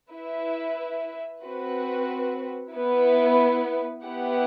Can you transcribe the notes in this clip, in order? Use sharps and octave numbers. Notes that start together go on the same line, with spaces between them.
E4 B4 E5
C4 F#4 B4
B3 E4 B4
B3 E4 G4 B4 F#5